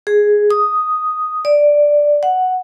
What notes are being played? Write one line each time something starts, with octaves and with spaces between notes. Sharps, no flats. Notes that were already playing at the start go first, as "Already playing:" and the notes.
G#4
D#6
D5
F#5